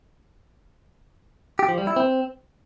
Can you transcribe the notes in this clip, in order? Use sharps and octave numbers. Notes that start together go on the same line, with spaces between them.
G4
F3
G3
E4
C4